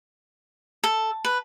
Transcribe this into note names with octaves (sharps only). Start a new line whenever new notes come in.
A4
B4